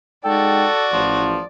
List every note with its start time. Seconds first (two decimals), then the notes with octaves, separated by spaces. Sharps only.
0.25 G#3 D#4 F#4 A4 D5 G5
0.93 A1 F3